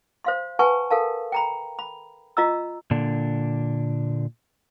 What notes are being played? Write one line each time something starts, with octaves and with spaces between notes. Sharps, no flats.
C5 F5 C6
B4 F#5 G#5 A5 C#6
A4 A#4 F5 A5
G5 A#5 B5
B5
F4 D#5 A#5 E6
A#2 D3 D4